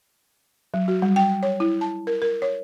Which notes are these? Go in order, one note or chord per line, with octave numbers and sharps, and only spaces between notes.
F#3
F#4
G3
G5
C#5
E4
A5
A#4
A#4
C#5